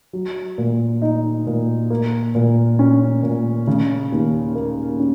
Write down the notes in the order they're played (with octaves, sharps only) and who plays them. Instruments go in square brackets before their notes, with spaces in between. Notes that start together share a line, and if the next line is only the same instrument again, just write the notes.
[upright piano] F#3
A#2
D#4
A#2
A#3
A#2
C#4
A#2
C#3
D#2
A#3
C#4